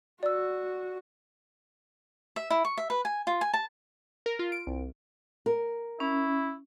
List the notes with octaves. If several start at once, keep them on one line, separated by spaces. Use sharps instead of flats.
F#4 D5 E6
E5
E4
C#6
E5
B4
G#5
F4
G#5
A5
A#4
F4
D7
C2
A#4
C#4 E4